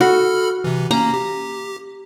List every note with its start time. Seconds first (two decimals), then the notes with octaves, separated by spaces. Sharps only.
0.01 F#4 A4 B5 F6
0.64 C3 E3
0.91 A#3 C#4 A#5
1.14 G4